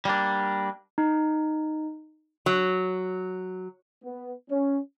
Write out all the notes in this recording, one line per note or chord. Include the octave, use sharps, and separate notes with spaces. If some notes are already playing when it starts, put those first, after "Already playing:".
G3 A#3 D4
D#4
F#3
B3
C#4